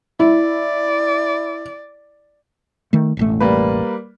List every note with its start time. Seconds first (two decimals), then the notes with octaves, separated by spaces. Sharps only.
0.20 E4 D5
2.93 D#3 A3
3.17 E1 A1 A3
3.40 G3 A#3 B4